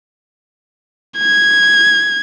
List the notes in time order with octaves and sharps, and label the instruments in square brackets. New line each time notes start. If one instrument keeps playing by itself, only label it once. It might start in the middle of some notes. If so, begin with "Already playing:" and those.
[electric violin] G#6